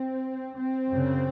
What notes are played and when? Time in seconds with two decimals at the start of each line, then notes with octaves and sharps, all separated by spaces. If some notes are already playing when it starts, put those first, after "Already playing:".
Already playing: C4
0.57 C4
0.89 F#2 C#3